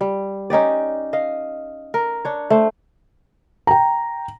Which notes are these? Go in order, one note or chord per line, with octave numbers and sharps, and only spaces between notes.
G3
C#4 D#4 G4 D5
D#5 F5
A#4
D4 C#5
A3 C5
G5 A#5